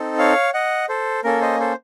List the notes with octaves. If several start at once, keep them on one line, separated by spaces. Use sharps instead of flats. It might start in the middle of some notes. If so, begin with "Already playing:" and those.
Already playing: C4 D#4 A4
C#5 F5
D#5 F#5
A4 C5
A#3 C#4 A4 A#4
C5 D#5
A4 C5